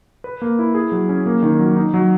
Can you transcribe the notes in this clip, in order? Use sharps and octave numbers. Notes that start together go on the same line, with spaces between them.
B4
A#3
E4
G#4
F#3
C#4
A#3
D#3
F#3
D#4
F#3